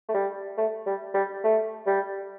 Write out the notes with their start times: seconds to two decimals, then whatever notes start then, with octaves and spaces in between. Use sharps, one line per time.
0.09 A3
0.14 G3
0.57 A3
0.86 G3
1.14 G3
1.44 A3
1.87 G3